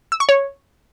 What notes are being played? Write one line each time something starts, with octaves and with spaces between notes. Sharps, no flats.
E6
C#6
C#5